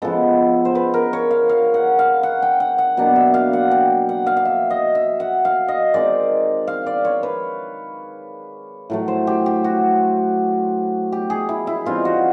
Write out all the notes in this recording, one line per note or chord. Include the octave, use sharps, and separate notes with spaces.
C#3 F3 G#3 B3 A4
C5
B4
A#4
C#5
F5
F5
F#5
F5
F#5
G5
F#5
F#5
B2 F#3 A#3 D4 F#5
E5
F5
F#5
G5
F#5
F5
F5
E5
D#5
E5
F#5
F5
D#5
D#3 G#3 C4 D#4 D5
F5
D5
C#5
B4
A2 F#3 A3
C5
G4
G4
F#4
G4
G#4
E4
E4
E3 G3 C4 D#4 F4
F#4